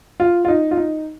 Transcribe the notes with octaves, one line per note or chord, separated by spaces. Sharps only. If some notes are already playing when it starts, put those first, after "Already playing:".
F4
F4
D#4
F4
D#4